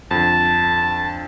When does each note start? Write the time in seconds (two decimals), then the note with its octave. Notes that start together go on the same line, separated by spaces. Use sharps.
0.11 F2 D3 A5